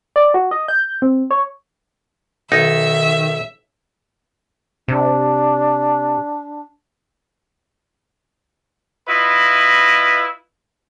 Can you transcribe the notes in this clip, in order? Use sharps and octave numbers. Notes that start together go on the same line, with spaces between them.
D5
F#4
D#5
G6
C4
C#5
B1 D#3 D#4 E5
C3 D4
E4 F4 B4 D#5